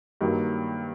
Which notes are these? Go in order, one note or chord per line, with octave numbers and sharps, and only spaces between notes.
G2 D#3 F#3 A#3